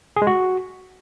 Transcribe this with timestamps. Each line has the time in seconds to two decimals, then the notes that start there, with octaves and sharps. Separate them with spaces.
0.16 G#4
0.22 G#3
0.27 F#4